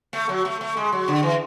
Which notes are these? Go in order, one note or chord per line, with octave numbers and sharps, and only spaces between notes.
A3
F#3
A3
A3
G#3
F#3
D3
E3